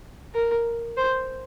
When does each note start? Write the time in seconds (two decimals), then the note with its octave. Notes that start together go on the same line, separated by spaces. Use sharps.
0.34 A#4
0.97 C5